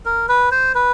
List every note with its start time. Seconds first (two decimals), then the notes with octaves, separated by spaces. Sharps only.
0.05 A#4
0.29 B4
0.51 C5
0.75 B4